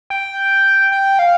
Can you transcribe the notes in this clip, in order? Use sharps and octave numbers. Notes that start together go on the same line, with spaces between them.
G5
G5
F5